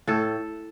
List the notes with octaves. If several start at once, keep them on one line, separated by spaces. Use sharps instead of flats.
A2 A4